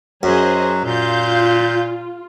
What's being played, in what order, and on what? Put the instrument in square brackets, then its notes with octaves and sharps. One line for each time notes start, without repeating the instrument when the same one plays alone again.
[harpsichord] F#2 [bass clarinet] F#3 [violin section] G#4 C5 D#5
[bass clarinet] A#2 [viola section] F4 [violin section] F5 G6